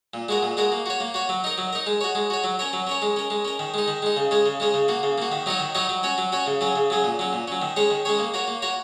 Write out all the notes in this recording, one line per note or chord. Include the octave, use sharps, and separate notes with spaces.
A#2
G#3 F#4 A#4
A#2
G#3 F#4 A#4
A#3
F#4 C#5
A#3
F#4 C#5
F#3
D#4 A#4
F#3
D#4 A#4
G#3
F#4 C#5
G#3
F#4 C#5
F#3
C#4 A#4 C#5
F#3
C#4 A#4 C#5
G#3
C#4 A#4
G#3
C#4 A#4
D#3
G#3 D#4
D#3
G#3 D#4
C#3
G#3 C#4 G#4
C#3
G#3 C#4 G#4
C#3
A#3 F#4
C#3
A#3 F#4
D#3
F#3 D#4 F#4 C#5
D#3
F#3 D#4 F#4 C#5
F#3
C#4 F#4 C#5
F#3
C#4 F#4 C#5
C#3
F#3 C#4 G#4
C#3
F#3 C#4 G#4
A#2
F#3 C#4
A#2
F#3 C#4
D#3
G#3 C#4 G#4 C#5
D#3
G#3 C#4 G#4 C#5
A#3
F#4 A#4 C#5
A#3
F#4 A#4 C#5